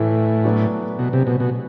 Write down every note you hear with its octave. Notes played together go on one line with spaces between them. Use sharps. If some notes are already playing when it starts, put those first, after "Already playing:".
Already playing: A2 E3 A3 E4
F#3 B3 D4 F#4
B2
C3
B2
B2